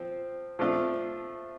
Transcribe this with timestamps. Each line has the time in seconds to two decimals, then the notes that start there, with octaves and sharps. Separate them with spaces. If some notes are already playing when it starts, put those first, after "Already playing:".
Already playing: F3 C4
0.59 F3 A3 D4 F4